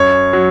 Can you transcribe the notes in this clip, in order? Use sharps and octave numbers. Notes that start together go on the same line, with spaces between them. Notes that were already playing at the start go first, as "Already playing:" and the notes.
Already playing: F#2 C#5
F#3